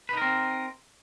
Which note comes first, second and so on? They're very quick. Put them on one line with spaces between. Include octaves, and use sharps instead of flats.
B4 D#4 A#4 C4